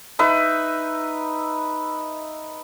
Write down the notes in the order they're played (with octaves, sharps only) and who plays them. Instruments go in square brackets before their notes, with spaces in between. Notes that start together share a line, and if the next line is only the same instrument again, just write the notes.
[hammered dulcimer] D#4 B4 E5